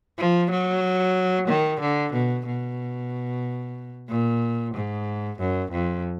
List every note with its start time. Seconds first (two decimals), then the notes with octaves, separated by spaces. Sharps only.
0.18 F3
0.51 F#3
1.48 D#3
1.81 D3
2.13 B2
2.46 B2
4.09 A#2
4.75 G#2
5.39 F#2
5.72 F2